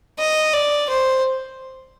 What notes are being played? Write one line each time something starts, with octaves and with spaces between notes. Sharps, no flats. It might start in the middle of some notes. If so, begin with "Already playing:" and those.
D#5
D5
C5